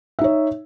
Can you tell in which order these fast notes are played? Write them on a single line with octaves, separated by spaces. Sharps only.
E5 D#4 C#5